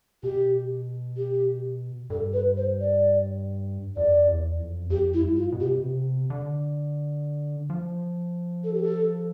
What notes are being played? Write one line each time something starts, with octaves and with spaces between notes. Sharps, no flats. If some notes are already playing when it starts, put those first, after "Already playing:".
B2 G4
G4
G2 A4
B4
C5
D5
F2 D5
E2
F2
F2 G4
E4
G2
F4
B2
C3 G4
B2
C3
D3
F3
A4
G4
A4